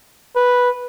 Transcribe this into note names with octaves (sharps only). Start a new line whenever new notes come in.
B4